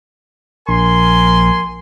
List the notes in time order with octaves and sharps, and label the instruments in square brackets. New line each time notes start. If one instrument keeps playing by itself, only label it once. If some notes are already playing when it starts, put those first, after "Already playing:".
[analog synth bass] A#1 [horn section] A#4 G#5 C6